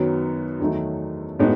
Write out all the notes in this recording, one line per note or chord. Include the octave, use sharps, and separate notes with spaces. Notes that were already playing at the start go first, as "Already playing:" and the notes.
Already playing: F#2 D#3 F#3 B3
E2 D#3 F#3 A3 D#4
A2 G#3 B3 D#4 F#4